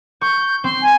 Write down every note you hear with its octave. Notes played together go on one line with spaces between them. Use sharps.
C#6 G6
C4 C6
G#5